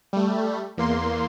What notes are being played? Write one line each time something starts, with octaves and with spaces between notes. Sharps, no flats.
G3 A3
E2 A#3 C6